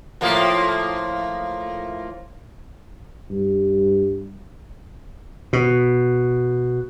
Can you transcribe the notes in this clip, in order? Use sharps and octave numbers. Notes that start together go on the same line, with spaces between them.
A2 F3 A#3
G2
B2